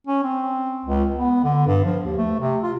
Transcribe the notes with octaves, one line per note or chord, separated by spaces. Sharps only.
C#4
C4
C#2
B3
D3
G2
F3
D#2
A3
C3
F4